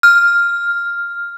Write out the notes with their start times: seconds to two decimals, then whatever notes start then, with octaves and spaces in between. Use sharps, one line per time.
0.03 F6